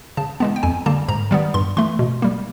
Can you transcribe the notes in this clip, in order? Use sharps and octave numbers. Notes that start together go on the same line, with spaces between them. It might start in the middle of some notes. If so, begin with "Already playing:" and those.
C#3 A5
E3 G#3 B3 A5
G5
F2 G#5
D3 G3 A#3 A5
G#2 A#5
D#3 G3 B3
G2 C6
E3 A3 C6
B2
G3 A#3